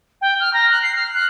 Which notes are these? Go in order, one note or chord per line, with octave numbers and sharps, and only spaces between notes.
G5
F6
A#5
F#6
C7
F6
F#6